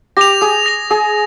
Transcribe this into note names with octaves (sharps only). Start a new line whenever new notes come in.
G4 A#6 F7
G#4 D#6
A#6 F7
G#4 D#6